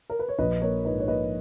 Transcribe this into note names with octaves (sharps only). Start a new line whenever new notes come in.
A#4
B4
C#5
A#1 B4 D#5
A#3 A#4 C#5
G#2 B4 D#5
C#5
A#3 B4 D#5